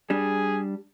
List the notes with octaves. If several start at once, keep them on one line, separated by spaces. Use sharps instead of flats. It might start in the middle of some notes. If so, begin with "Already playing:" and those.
G3 D4 G#4